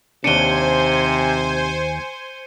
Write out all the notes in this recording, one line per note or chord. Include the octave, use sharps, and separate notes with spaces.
D#2 C3 D4 C5 G#5 C#7 D#7 G7